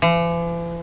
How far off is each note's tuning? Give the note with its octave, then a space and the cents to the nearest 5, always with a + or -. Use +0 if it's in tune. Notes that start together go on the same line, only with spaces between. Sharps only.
E3 +45